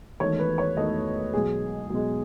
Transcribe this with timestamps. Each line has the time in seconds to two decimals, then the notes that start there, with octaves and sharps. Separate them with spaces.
0.20 E1 E2 D#3 A3 C#5
0.39 B4
0.58 C#5
0.77 E1 E2 D#3 A3 D#5
1.33 B1 B2 G#3 G#4
1.90 B1 B2 G#3